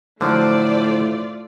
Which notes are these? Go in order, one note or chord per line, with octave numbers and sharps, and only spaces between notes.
A2 D3 F3 F#3 A3 F4 C5 D5